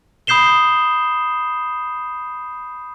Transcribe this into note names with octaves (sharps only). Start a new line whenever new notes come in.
B5 D#6 G6 C7 E7 G7